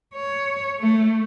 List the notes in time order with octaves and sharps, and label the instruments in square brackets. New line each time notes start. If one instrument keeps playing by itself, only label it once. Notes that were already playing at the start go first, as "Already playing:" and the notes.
[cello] C#5
A3